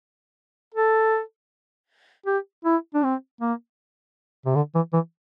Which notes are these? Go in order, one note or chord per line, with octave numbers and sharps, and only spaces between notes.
A4
G4
E4
D4
C4
A#3
C3
D3
E3
E3